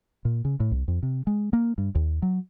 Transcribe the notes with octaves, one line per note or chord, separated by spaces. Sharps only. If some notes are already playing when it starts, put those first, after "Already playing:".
A#2
C#3
A2
C2
F2
C3
G#3
A#3
G2
D#2
F#3